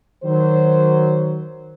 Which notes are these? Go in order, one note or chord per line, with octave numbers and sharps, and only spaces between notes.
D#3 F#3 C5